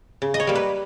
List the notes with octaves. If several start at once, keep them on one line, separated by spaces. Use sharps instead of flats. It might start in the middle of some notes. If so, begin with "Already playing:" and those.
C#3
D#5
C#5
G3 A#3
B4